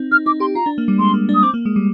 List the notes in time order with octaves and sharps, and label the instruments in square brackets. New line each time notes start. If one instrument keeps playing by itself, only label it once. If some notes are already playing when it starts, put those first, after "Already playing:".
Already playing: [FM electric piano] C4 D#4
[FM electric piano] D#4 [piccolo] F6
[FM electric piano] D#4 [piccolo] D6
[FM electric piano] G4 [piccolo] C6
[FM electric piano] F4 [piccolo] A#5
[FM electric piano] D4
A#3
G3
[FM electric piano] G#3 [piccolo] C6
[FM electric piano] A#3
D4
[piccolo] D#6
[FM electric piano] C4 [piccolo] D6
[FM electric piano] A#3
G#3
G3